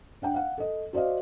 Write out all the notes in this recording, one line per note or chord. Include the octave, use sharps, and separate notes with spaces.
D4 F#5 G5
F5 F#5
A4 D#5
F#4 C5 D5 D#5 F5